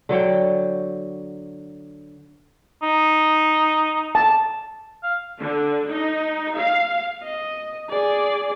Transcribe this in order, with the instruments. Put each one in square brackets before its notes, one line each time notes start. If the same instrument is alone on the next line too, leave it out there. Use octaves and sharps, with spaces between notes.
[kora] D3 F#3 C#5 G5
[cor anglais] D#4
[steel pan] A5
[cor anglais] F5
[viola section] D3
D#4
F5
[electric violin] D#5
G#4 D5